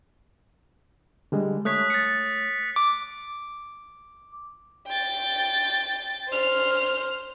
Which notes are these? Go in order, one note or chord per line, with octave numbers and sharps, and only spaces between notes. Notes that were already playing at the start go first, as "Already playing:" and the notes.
D3 G3 G#3
A3 C#5 D#6 F#6 B6
A6 C#7
D6
G5 A6
C5 F6